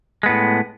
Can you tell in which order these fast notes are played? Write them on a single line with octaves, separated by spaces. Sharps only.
G#3 B3 A2